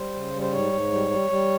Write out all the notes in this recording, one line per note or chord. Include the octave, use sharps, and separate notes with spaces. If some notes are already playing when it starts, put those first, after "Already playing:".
Already playing: G3 C5
C#3
G3
C5
G#2 C#5
G#2
G3
G3
G3